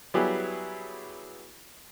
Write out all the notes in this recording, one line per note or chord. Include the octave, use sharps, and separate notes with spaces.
F#3 G3 B3 E4 G4 G#4